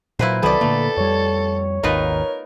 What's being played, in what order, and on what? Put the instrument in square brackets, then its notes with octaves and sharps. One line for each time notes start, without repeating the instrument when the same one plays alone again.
[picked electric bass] A#2 F#3 [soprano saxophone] A#3 [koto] E4 B4 C5
[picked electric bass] C2 D#3 F#3 [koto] B3 D5 [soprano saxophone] A4 [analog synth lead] B5
[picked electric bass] A#2 D3 A#3 [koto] A3
[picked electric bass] F2 G3 [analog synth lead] C#5
[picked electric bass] G#1 D#2 [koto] D#4 F4 B4 [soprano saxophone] A#4